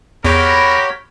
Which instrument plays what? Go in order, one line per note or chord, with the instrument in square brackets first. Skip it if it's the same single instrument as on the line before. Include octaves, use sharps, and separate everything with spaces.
[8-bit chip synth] E2 [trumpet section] F#4 G4 A#4 [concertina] C#5 [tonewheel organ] B5